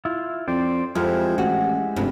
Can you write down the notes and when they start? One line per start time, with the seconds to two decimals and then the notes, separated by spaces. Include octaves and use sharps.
0.05 E4 F4
0.48 F2 C5 D5 G5
0.95 F2 F3 G#3 E4 G4
1.38 A1 F#4
1.96 F1 G2